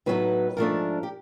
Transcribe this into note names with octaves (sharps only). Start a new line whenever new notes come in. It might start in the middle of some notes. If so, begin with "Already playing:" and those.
A2 F#3 B3 D#4 B4
G#2 F3 A3 D4 A#4
G4